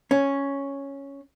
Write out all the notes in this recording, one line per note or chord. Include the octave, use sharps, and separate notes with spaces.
C#4